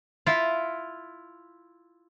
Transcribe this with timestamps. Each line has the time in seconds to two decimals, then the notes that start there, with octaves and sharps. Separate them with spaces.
0.26 E4 F4